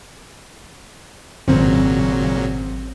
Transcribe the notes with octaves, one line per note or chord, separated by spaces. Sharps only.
G#1 A#2 C#3 F#3 C4